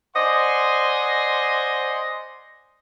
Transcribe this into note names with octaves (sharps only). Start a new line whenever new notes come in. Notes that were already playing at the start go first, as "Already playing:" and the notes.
C5 D5 D#5 F#5 G#5 C6